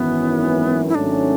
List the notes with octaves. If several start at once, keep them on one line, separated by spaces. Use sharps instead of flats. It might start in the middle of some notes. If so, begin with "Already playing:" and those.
Already playing: G#1 F#2 E3 B3
E4
G#1 G#2 F#3 A3 C#4 D4